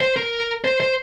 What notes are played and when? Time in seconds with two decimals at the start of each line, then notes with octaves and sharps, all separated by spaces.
0.01 C5
0.16 A#4
0.64 C5
0.80 C5